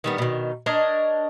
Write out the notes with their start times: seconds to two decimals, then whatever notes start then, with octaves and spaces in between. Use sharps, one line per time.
0.04 D#3 G3 B3
0.18 B2 D#3
0.66 D4 A#4 C#5 D#5